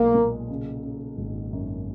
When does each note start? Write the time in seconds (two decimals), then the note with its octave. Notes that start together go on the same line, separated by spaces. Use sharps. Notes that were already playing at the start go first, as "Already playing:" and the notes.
Already playing: B1 A#2 G#3 A#3
0.15 A#2
0.50 C#3
0.83 C#3
1.17 G#1
1.53 F#2